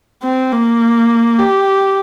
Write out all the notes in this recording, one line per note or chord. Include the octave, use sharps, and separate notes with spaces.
C4
A#3
G4